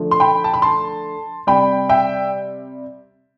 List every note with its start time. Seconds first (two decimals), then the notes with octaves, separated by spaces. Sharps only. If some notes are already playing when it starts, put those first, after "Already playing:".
Already playing: D3 F3 A3
0.11 C6
0.20 G5 B5
0.44 A5
0.54 B5
0.62 A5 C6
1.47 C3 G3 G5 B5
1.89 E5 G5